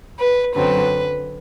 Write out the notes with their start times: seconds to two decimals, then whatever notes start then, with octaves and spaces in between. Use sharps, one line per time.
0.19 B4
0.55 F#2 D3 F#3 C4 B4